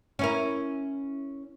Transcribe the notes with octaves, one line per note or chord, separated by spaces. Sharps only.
C#4 E4 A#4